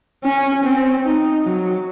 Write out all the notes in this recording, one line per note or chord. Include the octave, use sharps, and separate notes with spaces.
C#4
C4
D#4
F#3